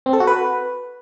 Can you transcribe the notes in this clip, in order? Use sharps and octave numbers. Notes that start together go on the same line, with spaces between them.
C4
A4
F#4
B4